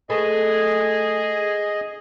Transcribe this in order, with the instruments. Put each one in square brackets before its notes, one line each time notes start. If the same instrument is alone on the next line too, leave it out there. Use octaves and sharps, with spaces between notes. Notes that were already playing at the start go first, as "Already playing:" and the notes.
[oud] A3 A4 B4 [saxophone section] G#4 [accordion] D#5